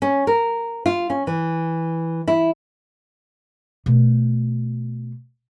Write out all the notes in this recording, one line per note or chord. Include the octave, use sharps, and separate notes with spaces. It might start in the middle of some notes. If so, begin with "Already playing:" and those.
C#4
A#4
F4
C#4
E3
E4
B2 A3